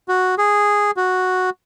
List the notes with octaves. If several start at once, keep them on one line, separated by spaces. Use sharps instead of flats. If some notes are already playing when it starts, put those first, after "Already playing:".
F#4
G#4
F#4